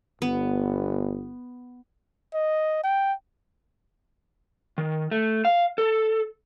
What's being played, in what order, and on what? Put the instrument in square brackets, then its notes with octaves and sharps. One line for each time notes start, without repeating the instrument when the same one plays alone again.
[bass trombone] G1 [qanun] B3
[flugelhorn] D#5
G5
[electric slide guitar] D#3
A3
F5
A4